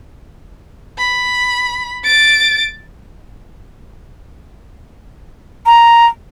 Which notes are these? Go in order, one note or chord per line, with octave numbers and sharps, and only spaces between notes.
B5
A6 D7
A#5